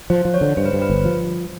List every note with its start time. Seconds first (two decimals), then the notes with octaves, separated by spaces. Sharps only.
0.10 F3 C5
0.25 F3
0.34 C#5
0.41 D3
0.57 G2 C5
0.65 B4
0.73 G2 C5
0.82 B4
0.90 G1
1.05 F3